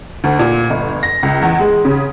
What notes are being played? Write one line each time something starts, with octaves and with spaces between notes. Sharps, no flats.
D2
A#2
G1
A#6
C#2
E2
G#3
C#3